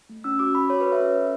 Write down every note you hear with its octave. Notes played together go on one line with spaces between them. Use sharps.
A3
C#4 E6
F#4 D6
F#4 B5
F#4 C#5
B4
A4
E5
C#4
A4